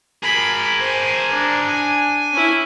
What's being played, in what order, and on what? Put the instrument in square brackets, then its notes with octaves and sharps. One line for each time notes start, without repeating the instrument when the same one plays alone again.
[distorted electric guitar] G#4 A#4 [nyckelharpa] B5
[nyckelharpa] C5 G#5
D4
[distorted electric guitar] G#5
[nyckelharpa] C#4 E4